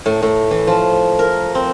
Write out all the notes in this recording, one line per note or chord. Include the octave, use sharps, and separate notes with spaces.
A2
A2
E3
F3
A#4
C4